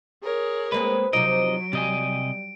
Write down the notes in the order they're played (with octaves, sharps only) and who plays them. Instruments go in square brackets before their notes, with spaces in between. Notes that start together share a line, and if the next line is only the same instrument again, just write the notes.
[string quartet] G#4 A#4 C#5
[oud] G#3 A#3 C4 [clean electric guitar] B4
[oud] C3 F3 D#4 [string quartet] F#3 [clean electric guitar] D#5 [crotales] D7
[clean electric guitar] C3 D#5 G#5 [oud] G3